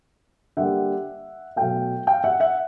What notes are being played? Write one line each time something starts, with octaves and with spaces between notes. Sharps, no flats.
D3 G3 A#3 E5 F#5
B2 F#3 A3 F5 G5
F5 G5
E5 F#5
E5 F#5